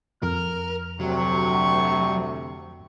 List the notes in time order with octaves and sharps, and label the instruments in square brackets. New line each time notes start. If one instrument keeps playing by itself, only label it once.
[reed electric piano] F2 [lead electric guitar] A#4 [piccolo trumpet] F6
[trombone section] D2 C3 [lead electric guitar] F#3 [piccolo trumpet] C#6